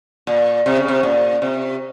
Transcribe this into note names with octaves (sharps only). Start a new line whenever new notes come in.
A#2
C3
C#3
C3
A#2
C3